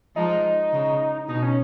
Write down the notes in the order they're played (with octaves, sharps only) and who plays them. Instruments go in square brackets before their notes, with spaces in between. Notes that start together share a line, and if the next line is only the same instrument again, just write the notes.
[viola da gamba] F3 G#3 [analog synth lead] D#4
[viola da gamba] C#3
[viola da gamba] B2 [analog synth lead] D#4
[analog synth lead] C#4